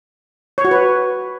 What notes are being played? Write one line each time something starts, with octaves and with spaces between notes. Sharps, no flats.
C#5
F#4
B4